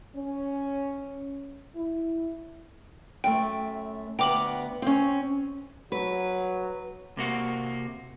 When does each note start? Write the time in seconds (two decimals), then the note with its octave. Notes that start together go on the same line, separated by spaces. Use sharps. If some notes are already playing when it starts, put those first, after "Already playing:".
0.16 C#4
1.75 E4
3.24 F#2 A3 G5
4.19 D2 B3 G5 A#5 D6 F#7
4.82 C4 C#4
5.92 F#3 B4
7.17 C3 A#3 F#4